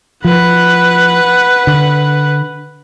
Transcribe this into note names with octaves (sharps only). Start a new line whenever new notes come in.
F3 B4 F#5
D3